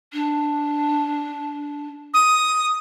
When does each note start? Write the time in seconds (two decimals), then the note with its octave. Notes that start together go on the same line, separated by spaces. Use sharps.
0.13 D4
2.14 D#6